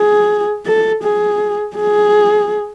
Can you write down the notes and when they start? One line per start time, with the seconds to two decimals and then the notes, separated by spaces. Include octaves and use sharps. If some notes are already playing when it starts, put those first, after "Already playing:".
Already playing: G#4
0.66 A4
1.03 G#4
1.76 G#4